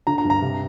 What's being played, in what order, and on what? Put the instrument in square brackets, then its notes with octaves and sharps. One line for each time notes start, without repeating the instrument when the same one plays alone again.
[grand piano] D3 A#5
A#5
G2
A#5
C3